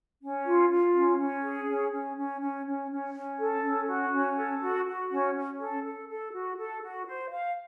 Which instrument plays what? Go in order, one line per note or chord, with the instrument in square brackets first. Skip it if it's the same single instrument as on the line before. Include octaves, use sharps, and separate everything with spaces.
[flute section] C#4
F4
F4
C#4
C#4
G#4
C#4
C#4
C#4
C#4
C#4
C#4
C#4
A4
C#4
F#4
C#4
A4
F#4
F#4
C#4
C#4
A4
A4
A4
F#4
A4
F#4
C5
F5